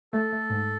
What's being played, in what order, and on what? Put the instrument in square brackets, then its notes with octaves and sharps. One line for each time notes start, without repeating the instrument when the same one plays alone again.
[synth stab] A3 [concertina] A4
[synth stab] A3
G#2